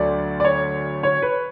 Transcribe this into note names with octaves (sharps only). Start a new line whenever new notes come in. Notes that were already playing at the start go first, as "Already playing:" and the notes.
Already playing: D2 D3 F#3 A3 D5
D5
C#5
C#5
B4